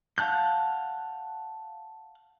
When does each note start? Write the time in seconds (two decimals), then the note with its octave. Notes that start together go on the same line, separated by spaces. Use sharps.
0.18 F5 F#5 A5 F#6 G6